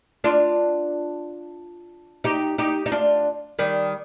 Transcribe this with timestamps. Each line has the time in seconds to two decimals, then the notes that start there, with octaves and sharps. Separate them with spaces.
0.24 D4 F4
2.24 D#4 G4
2.58 D#4 G4
2.86 D#4
2.92 D4 F4
3.59 D#3 G3